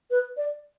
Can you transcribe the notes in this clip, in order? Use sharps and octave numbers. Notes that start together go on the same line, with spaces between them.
B4
D5